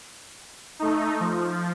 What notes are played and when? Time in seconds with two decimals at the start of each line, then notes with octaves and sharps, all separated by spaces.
0.79 A3 D#4
1.20 F3